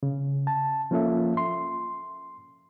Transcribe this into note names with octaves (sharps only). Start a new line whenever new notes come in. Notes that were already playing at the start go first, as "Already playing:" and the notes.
C#3
A5
F3 A#3 C#4 F4 A4 E5
C6